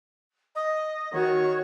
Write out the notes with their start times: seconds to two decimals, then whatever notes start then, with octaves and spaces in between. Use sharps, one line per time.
0.55 D#5
1.13 D#3 F#4 C#5